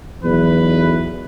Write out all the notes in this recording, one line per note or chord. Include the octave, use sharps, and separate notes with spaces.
B1 E2 B4